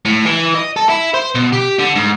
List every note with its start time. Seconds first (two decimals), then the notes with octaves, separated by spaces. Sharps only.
0.05 A2
0.25 E3
0.55 D#5
0.76 A4
0.89 E4
1.14 C5
1.35 B2
1.53 G4
1.79 D3
1.96 G#2